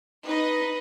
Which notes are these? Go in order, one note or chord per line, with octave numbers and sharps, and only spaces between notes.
D#4 B4 D#5